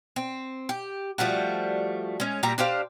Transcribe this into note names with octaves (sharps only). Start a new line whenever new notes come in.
C4
G4
F3 G3 A3 F#4
G#3 C#4
A#2 G3 G4 A#5
D4 G4 C5 F5